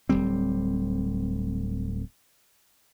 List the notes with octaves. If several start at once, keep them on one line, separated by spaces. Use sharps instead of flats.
D1 E2 G3 C4